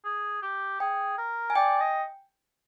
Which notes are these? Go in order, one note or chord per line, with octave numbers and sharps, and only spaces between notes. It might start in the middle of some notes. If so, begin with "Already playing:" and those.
G#4
G4
G#4 G5
A#4
G#5
D5 G5
D#5